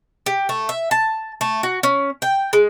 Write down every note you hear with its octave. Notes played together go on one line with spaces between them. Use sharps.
G4
A3
E5
A5
A3
F#4
C#4
G5
G#3